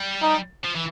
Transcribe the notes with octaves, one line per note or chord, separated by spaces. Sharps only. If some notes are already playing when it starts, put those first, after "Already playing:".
Already playing: G3
D#4
F3
E3